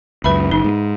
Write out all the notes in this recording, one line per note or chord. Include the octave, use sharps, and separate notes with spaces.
C#2 F#2 B4 E5 B5
F#1 D#4
G#2